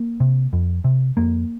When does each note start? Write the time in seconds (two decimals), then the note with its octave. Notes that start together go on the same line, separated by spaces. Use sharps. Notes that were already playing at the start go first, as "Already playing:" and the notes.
Already playing: A#3
0.20 C3
0.53 F2
0.84 C3
1.17 F2 A#3